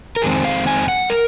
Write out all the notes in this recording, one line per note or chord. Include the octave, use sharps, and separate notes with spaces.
A#4
F2 D#3 G#3 C4 G#4
F5
G#5
F#5
A#4